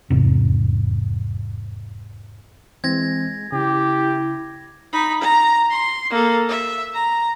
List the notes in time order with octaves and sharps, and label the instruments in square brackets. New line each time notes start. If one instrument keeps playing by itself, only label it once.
[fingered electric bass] F1 E2 G#2 C3
[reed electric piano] E3 C4 [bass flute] G#3 [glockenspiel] G#6 A#6
[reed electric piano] C#3 [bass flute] E4 [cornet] G4
[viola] D#4 B5
A#5
C6
A#3 A4
E5
A#5